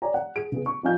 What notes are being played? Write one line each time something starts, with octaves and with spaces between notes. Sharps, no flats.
C#5 D5 G#5 A#5
F#5
G#4 D7
C#3 B3 G#4
C#6
F3 C#4 D#4 F5 G#5 G6